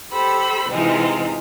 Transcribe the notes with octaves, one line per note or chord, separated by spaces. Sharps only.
G4 A4 C5 B5 E6
C3 E3 G#3 C4 D#4 F4